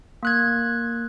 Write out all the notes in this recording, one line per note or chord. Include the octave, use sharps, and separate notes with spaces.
A#3 F#6 G#6